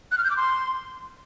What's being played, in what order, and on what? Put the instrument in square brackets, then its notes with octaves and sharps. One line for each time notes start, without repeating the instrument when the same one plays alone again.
[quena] F#6
F6
G6
D6
C6